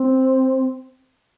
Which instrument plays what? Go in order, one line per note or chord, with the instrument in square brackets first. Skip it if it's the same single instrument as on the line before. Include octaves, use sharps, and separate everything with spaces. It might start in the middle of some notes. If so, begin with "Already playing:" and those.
Already playing: [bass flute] C4